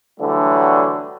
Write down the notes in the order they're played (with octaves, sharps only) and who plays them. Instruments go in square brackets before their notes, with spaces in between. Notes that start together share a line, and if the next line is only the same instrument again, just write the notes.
[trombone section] D3 E3 F#3 G3 A3